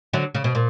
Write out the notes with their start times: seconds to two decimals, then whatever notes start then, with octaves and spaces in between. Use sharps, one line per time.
0.13 D3 F#3
0.35 C#3
0.44 B2
0.55 A#2